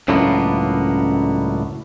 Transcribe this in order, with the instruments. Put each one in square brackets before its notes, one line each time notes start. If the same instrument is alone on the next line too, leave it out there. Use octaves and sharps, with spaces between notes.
[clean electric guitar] C#2 F#2 A2 D3 A#3 B3